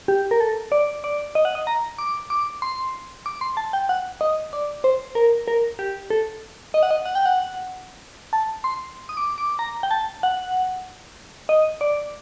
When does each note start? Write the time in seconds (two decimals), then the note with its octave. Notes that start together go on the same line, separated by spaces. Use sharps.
0.08 G4
0.31 A#4
0.40 A4
0.72 D5
1.04 D5
1.35 D#5
1.45 F#5
1.55 D#5
1.67 A#5
1.98 D6
2.30 D6
2.62 C6
3.26 D6
3.41 C6
3.57 A5
3.73 G5
3.89 F#5
4.21 D#5
4.53 D5
4.84 C5
5.15 A#4
5.48 A#4
5.79 G4
6.10 A4
6.74 D#5
6.83 F#5
6.91 D#5
7.05 F#5
7.15 G5
7.26 F#5
8.33 A5
8.64 C6
9.09 D#6
9.17 D6
9.38 D6
9.59 A#5
9.83 G5
9.91 A5
10.23 F#5
11.49 D#5
11.81 D5